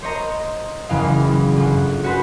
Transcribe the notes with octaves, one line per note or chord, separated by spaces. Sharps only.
C5 C#5 D#5 A#5
F#1 E2 C#3 B3 F5
G1 F4 D5
C#4 F#4 G#4 B4 C5